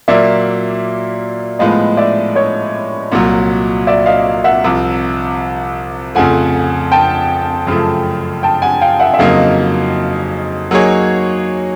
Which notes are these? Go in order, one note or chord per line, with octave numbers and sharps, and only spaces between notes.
A#2 F#3 A#3 D5 E5
A2 F3 G#3 B3 D#5 F5
D5 E5
C#5 D#5
C2 A#2 F#3
D5 E5
D#5 F5
E5 F#5
C2 C3 F3
F2 C#3 F3 A3 F#5 G#5
G5 A5
F#2 C#3 F3 A3
G5 A5
F#5 G#5
F5 G5
E5 F#5
E5
F2 C#3 F#3 A#3 D#4 D#5 F5
F#3 A#3 D#4 G#4 C#5